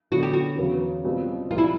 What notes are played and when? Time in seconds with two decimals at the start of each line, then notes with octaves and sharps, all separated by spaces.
0.11 D3 F#3 B3 F#4
0.23 G4
0.33 F#4
0.58 E2 C#3 F#3
1.04 B2 G3 C4 F4
1.51 C2 C3 F3 F4
1.58 E4